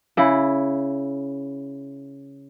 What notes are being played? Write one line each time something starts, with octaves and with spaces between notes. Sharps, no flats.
C#3 E4